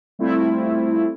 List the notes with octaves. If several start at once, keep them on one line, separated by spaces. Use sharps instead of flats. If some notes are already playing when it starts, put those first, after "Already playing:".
G3 A3 C4 E4 F4